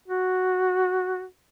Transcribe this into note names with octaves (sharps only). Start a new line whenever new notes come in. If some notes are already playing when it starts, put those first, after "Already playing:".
F#4